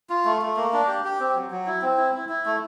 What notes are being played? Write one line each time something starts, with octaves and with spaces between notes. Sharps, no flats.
F4
A3
A3
A#3
D4
G4
G4
C4
F#3
F#3
E4
C4
E4
E4
E4
A3